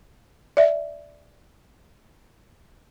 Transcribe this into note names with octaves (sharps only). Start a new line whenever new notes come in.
D5 E5